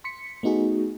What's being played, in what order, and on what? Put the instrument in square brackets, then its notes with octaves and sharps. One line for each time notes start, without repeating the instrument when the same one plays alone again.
[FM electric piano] C6 B6 C#7
A3 B3 D#4 F#4 G#4